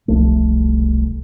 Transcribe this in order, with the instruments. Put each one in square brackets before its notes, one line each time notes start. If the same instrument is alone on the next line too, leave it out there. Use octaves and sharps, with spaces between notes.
[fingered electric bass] E1 C2 F3 A3